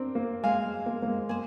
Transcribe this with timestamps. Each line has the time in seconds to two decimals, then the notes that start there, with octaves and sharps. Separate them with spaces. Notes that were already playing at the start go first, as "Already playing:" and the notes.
Already playing: C4 D4 A#4 D5
0.15 A#3
0.43 G#3 C5 F5 G#5
0.65 G#3
0.86 A#3
1.02 A#3
1.08 G#3
1.29 A#3 G#4 C5